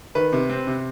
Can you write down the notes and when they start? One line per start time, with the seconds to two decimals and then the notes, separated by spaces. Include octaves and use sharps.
0.15 D#3 B4
0.32 C3
0.50 C4
0.67 C3